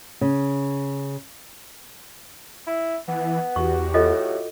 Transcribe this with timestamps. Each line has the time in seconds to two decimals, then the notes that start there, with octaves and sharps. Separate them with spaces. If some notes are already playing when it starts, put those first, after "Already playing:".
0.21 C#3
2.67 E4
3.08 E3 B3
3.56 E2 F#4 G4 C#6
3.94 A2 F4 A4 D#5